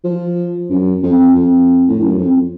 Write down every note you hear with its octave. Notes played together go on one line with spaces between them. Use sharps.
F3
F#2
F2
F2
A2
F#2
F2